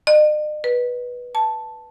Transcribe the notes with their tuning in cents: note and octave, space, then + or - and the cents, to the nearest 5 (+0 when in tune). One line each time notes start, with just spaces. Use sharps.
D#5 -45
B4 -10
A5 +0